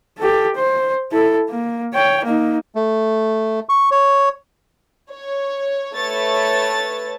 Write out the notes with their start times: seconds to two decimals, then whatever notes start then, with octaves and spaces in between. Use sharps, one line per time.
0.19 G4 A4
0.56 C5
1.12 E4 A4
1.50 A#3
1.93 C#5 G5
2.24 A#3 D#4
2.75 A3
3.69 C#6
3.91 C#5
5.10 C#5
5.94 A3 B4 C#5 A5 A6